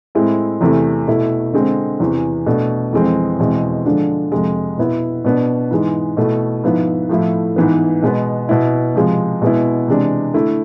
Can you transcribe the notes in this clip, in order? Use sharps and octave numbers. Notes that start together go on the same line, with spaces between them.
A2 G#3 C4 E4
E2 C3 E3 A3 E4
B2 A3 E4
D3 G#3 C4
E2 C3 E3
B2 A3 D4
F2 E3 G#3 C4
E2 B2 G#3 C4 E4
D3 F3 G#3 D4
F2 C3 G#3
B2 B3 E4
B2 B3 D4
G#2 E3 G#3
B2 A3 E4
G#2 F3 B3 E4
A2 F3 A3 E4
G#2 E3 B3
B2 G#3 B3
B2 B3 E4
C3 F3 G#3
B2 G#3 B3 E4
C3 E3 G#3 D4
D3 A3 E4